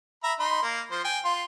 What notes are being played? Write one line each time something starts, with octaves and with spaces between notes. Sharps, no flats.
E5 A#5 B5
D#4 B5 C6
A#3
F3 C5
G5 G#5
F4 C6